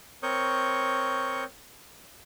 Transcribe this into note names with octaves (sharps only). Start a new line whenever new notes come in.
C4 A#4 C#5 C#6 D#6 G6